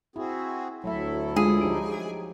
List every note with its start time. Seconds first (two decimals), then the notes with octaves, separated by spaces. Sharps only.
0.16 C4 E4 F#4 G#4
0.84 D2 F#3 A3 E4 A4 E5
1.36 G#3 D4 F4 G#4
1.61 F3 D#4 G4 D7